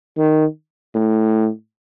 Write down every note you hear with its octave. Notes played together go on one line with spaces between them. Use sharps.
D#3
A2